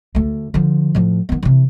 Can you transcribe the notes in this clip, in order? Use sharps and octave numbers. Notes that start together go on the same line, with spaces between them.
D2 A3
D3 F3
A2 F3
D#3 B3
C3 E3